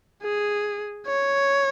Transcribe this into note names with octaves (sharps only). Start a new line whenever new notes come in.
G#4
C#5